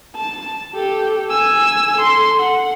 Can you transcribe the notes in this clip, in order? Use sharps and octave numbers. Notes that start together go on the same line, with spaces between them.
A5
G4 A4
G#5 E6
A4 C6
F#5